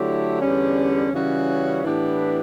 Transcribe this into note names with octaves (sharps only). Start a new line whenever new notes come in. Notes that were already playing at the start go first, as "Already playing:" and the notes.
Already playing: D3 F#3 A3 E4 G4
E2 D3 G3 C#4
C#3 E3 G3 C#4 F#4
A2 E3 B3 D4 G4